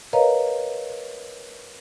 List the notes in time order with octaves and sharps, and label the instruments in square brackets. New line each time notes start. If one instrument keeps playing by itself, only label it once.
[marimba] A#4 B4 C#5 D#5 F5 A#5